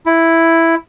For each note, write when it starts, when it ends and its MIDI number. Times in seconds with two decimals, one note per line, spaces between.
0.06 0.75 64